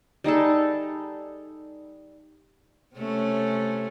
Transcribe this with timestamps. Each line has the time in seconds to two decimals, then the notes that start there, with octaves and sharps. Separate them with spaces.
0.24 G3 D#4 G#4 A4
2.96 C3 A3 C#4